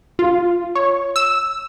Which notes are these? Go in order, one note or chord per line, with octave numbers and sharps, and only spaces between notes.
F4
C#5
E6